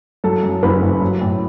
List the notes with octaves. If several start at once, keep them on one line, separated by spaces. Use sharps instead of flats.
F#3 A4
F#2
F#1 B4
F#1
F#3
A2